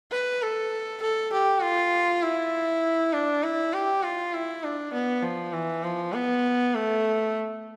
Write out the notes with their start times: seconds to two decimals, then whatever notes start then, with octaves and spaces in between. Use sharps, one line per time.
0.12 B4
0.42 A4
1.02 A4
1.33 G4
1.63 F4
2.23 E4
3.13 D4
3.43 E4
3.73 G4
4.03 F4
4.33 E4
4.64 D4
4.93 B3
5.23 F3
5.53 E3
5.84 F3
6.14 B3
6.75 A3